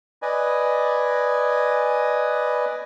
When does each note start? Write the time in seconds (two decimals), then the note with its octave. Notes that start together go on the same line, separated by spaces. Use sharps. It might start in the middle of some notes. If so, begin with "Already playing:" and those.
0.22 B4 D5 D#5 G#5